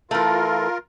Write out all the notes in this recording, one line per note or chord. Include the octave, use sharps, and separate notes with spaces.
E3 A3 F4 A#4